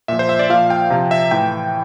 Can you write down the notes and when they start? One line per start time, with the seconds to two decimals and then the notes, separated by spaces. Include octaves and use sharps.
0.08 A#2 F3 E5
0.19 C5
0.29 E5
0.39 D5
0.49 A#2 F3 F5
0.70 G5
0.90 C3 F3
1.11 E5
1.31 A2 E3 G5